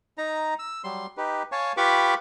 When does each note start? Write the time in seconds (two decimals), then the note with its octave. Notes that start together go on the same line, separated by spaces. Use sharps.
0.18 D#4 A#5
0.59 E6
0.84 F#3 G3 C6
1.17 D#4 G4 B4
1.52 C#5 F5 G#5 A5 C#6
1.77 F4 G4 B4 B5 C#6 D6